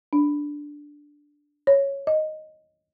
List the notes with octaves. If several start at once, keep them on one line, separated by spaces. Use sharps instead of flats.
D4
C#5
D#5